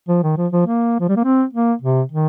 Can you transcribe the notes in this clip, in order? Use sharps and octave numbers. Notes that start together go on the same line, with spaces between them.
F3
D#3
F3
F3
A#3
F3
G3
A#3
C4
A#3
C3
D#3